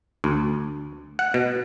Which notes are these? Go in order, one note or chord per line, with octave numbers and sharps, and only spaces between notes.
D2
F#5
B2